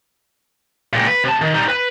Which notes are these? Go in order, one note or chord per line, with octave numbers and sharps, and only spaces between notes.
C#2 A#2
B4
C3 A5
D#3
G3 D#4
B4